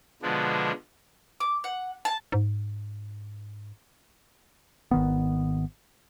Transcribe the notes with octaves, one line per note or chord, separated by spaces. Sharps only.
B2 D3 F3 G#3 B3 D4
D6
F#5
A5
G#2
G#1 D#3 B3